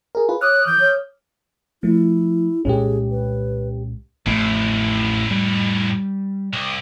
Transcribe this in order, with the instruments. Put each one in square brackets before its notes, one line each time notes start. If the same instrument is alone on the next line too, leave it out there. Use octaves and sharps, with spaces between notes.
[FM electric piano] G#4 A#4
F4 G#4 B4
[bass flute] C#5 [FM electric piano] D6 D#6 F6 [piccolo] F#6
[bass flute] E3 [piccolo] G6
[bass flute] C#5
[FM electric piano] F3 A3 [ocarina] E4
[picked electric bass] C2 A#2 G#3 [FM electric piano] C#4 G4 [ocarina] G#4
[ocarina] B4
[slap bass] A1 A3 [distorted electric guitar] F2 A2
[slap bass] G3
[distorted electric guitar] C2